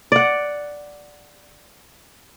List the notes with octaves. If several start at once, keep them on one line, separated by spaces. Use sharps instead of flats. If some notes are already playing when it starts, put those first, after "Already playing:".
D5 F#5